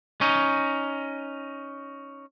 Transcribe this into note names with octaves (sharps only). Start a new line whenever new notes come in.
C#4 D#4